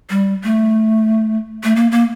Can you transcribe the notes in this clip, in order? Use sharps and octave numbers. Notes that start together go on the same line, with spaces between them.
G3
A3
A3
A#3
A#3